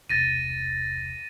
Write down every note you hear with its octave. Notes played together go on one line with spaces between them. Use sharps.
E1 C2 A6 A#6 D#7